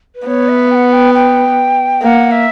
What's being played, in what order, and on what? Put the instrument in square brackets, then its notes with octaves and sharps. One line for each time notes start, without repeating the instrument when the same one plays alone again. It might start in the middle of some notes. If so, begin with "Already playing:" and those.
[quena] B4
[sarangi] B3 [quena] C#5
[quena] E5
G5
F#5
G5
G5
[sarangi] A#3 [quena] G5
[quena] F#5
E5